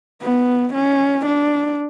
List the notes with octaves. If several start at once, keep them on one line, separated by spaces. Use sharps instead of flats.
B3
C#4
D4